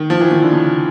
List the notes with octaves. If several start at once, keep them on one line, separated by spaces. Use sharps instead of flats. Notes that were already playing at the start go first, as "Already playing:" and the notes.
Already playing: D#3
F3
E3
D#3
D3
C#3